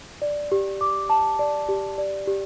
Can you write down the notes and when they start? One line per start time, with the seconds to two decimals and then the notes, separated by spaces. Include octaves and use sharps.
0.22 D5
0.52 G4
0.81 D6
1.10 A5
1.39 D5
1.69 G4
1.98 D5
2.27 G4